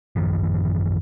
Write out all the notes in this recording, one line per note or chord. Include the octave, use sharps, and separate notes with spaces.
A1 F#2 D#3 F3